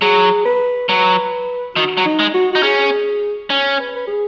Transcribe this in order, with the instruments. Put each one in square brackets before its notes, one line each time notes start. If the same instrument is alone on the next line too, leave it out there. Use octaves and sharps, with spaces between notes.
[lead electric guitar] F#3 [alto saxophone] G#4
[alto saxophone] B4
[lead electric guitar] F#3 [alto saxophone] B4
[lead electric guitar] D#3 [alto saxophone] F#4
[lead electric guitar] F#3
[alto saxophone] D#4
[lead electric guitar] G#3
[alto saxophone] F#4
[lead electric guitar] D#4 [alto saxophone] F#4
[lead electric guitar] C#4 [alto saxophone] G#4
[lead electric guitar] C#4
[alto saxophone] B4
B4
G#4